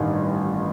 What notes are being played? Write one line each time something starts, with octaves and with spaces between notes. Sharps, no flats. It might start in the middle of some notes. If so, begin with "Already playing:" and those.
Already playing: A1 G2 D#3